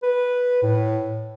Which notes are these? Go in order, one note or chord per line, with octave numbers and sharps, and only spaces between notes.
B4
A2